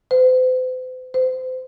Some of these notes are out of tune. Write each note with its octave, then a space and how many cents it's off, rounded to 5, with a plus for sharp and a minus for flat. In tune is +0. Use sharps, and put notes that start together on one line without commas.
C5 -45
C5 -30